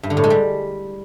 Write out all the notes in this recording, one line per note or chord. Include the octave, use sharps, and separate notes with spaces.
G2
D3
A2
G#3
G3